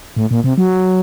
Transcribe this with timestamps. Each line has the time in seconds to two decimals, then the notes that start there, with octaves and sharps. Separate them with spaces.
0.16 A2
0.31 A#2
0.44 C3
0.58 F#3